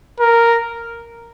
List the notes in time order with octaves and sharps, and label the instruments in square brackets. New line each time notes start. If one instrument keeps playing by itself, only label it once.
[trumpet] A#4